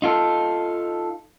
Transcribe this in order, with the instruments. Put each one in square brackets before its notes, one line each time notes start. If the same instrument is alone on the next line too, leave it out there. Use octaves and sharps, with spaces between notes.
[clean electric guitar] D#4 F4 A4